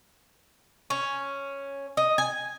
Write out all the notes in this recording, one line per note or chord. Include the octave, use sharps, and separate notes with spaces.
C#4
D#5
G#5